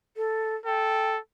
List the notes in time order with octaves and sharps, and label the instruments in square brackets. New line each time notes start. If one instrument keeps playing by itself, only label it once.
[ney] A4
[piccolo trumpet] A4 [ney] G5